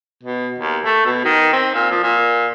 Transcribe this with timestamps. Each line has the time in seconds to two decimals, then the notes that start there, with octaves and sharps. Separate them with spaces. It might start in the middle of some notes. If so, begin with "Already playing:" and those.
0.23 B2
0.58 D#2
0.85 A3
1.06 B2
1.25 D#3
1.53 C4
1.74 A#2
1.91 F3
2.03 A#2